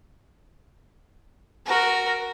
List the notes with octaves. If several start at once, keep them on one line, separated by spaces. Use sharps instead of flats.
F#4 A#4